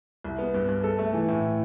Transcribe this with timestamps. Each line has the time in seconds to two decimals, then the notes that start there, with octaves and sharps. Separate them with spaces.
0.24 C2
0.39 B3
0.54 G2
0.69 G2
0.84 A4
0.99 A3
1.13 E3
1.28 A2